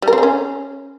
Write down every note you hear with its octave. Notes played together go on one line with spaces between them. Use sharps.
G3
A#4
C4
G#4
C#4